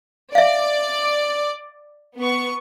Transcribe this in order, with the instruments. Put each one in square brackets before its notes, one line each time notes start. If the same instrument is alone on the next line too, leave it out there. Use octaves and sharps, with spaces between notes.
[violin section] D5 [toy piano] E5 F5
[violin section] B3 C#6